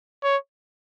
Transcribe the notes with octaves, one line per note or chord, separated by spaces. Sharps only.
C#5